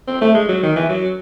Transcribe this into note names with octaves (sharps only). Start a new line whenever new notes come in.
C4
A3
G#3
F#3
D#3
E3
F#3